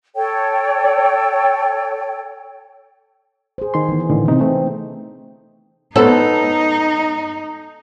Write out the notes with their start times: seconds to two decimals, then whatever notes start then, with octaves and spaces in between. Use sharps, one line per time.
0.16 A4 C#5 G5
3.58 G#4 C5
3.74 D#3 C6
3.89 E3 B3
4.10 A2 D3 D#3
4.28 C3 B3 C4 D#4
4.41 A3 D#4 C5
5.96 B3 D#4 A4 C5 C#5